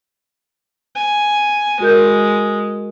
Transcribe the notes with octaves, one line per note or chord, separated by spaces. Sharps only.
G#5
G#3 F#4 A#4 G6